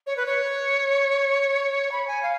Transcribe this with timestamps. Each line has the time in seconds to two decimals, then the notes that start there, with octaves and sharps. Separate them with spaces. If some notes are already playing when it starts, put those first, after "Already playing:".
0.06 C#5
0.16 B4
0.26 C#5
1.91 B5
2.07 G#5
2.22 F5